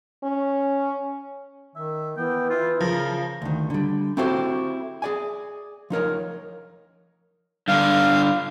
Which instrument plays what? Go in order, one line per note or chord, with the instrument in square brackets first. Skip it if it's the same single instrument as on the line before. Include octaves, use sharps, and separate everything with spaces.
[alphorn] C#4
[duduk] D#3 [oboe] E5
[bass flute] E3 [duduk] B3 [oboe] G5
[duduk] E4 [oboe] F4
[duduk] C#3 [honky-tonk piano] F3 [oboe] A#4
[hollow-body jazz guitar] D2 D#3
D3 G3
C4 E4 F#4 G4 A4 C5
G#4 D5 G#5
F3 D#4 A#4 C#5
[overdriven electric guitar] G2 D3 [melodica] F5